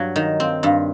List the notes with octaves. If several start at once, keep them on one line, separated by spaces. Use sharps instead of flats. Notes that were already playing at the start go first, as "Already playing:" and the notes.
Already playing: G2 F#3
D#3
C4
G2